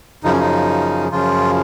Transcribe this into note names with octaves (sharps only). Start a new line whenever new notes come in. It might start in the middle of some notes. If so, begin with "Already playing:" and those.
F#2 C#3 F3 D#4
C#4
D#4
F#2 C#3 F3 F4